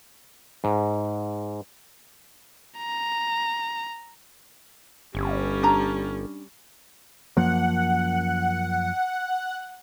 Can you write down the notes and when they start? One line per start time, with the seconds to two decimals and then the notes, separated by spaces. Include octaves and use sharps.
0.64 G#2
2.78 A#5
5.15 G1 G3 C#4
5.63 D4 A#5
7.37 F#2 F3 A#3 F#5